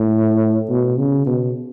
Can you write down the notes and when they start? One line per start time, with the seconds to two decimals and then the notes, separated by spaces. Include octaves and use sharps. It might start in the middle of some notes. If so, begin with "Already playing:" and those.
Already playing: A2
0.69 B2
0.98 C#3
1.26 B2